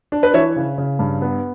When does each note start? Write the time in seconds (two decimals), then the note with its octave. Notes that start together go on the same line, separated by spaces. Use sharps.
0.12 D4
0.23 B4
0.34 E3 C#5 E5
0.56 C#3
0.78 C#3
0.99 G2
1.22 B3